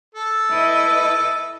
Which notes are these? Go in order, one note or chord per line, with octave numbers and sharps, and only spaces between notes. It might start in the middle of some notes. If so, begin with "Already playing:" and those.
A4
E4 B4 D#5